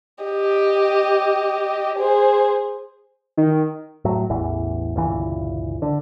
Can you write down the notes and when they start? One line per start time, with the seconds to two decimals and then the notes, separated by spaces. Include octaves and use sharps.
0.24 G4 D#5
1.99 G#4 C5
3.37 D#3
4.05 A2 F#3
4.30 A1 E2 E3
4.96 G1 C#2 A#2 E3
5.82 D3